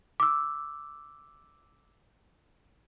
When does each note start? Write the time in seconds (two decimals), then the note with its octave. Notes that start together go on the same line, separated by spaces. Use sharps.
0.20 D6 E6